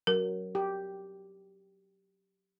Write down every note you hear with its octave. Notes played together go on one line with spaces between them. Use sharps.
F#3 A#4
G4